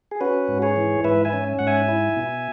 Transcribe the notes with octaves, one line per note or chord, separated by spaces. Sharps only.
G#4
C#4 F#4 B4
G#2
G#4 C#5
E3
G#2 B4 E5
E5 G#5
C#4
G#2 F#5
E5 G#5
E4
B2